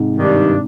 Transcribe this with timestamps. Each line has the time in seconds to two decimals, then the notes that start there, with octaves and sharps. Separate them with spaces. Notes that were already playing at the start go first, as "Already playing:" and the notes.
Already playing: G#2 C3
0.16 G2 D#3 G3 D4